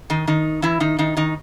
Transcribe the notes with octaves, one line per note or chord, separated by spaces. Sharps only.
D#3 D#4
D#3 D#4
E3 E4
D#3 D#4
D#3 D#4
D#3 D#4